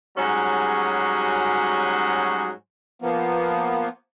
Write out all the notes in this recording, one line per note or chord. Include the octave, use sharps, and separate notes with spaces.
G#2 F#3 G3 C#4 F#4 G#4
F3 A#3 B3